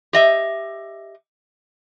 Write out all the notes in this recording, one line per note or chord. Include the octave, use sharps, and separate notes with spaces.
G4 D#5 E5